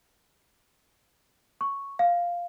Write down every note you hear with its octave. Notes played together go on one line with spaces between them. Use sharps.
C#6
F5